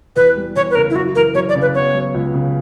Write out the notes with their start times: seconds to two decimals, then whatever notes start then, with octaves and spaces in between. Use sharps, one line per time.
0.16 E2 B4
0.36 G3
0.56 E2 C#5
0.71 B4
0.75 C#3 A#4
0.90 E4
0.95 F#2 F#4
1.15 E3 A#4
1.35 F#2 C#5
1.49 D5
1.55 C#3
1.61 B4
1.75 B3 C#5
1.94 F#3
2.14 C#2
2.34 C#3